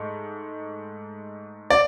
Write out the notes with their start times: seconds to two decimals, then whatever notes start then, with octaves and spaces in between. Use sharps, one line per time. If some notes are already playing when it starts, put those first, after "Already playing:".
Already playing: G#2 A3
1.70 D5